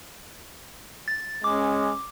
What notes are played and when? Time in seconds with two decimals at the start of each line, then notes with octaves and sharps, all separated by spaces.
1.08 A6
1.44 G#3 C#4 D6